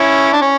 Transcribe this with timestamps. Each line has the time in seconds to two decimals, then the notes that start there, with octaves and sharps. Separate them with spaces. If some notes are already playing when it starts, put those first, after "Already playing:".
Already playing: C#4 E4
0.33 D4
0.42 C#4